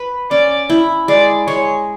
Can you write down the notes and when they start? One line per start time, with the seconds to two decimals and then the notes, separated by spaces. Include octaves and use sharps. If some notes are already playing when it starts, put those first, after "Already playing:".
Already playing: B4
0.30 C#4 D5
0.70 E4
1.08 G#3 D5
1.47 G#3 C#5